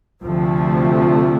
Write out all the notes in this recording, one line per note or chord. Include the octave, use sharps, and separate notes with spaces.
D2 C3 F3 A3